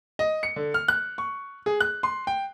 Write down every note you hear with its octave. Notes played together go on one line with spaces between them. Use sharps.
D#5
C#7
D3
F6
F#6
C#6
G#4
F#6
C6
G5